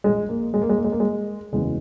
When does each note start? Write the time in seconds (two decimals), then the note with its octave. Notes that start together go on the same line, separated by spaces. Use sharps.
0.04 A#1 A#2 G#3
0.29 A#3
0.54 G#3
0.62 A#3
0.69 G#3
0.77 A#3
0.84 G#3
0.92 A#3
1.00 G#3
1.53 F#1 E2 C#3 G#3